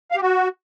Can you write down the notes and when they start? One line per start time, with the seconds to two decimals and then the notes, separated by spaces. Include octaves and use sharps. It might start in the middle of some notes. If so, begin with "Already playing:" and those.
0.11 F5
0.17 G4
0.22 F#4